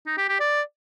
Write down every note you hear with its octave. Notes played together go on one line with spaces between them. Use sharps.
D#4
G4
G4
D5